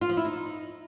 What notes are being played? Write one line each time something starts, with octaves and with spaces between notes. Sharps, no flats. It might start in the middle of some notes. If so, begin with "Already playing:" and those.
F4
F3
E4
D#4